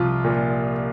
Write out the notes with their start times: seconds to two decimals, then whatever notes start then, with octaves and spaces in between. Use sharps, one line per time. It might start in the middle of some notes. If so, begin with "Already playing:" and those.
Already playing: C2 F3 F4
0.24 A#2